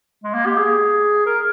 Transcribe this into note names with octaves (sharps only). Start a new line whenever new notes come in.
G#3
A#3
G4
G#4
A#4